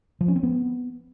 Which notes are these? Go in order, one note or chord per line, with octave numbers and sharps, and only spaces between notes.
F3
C#4
C4
B3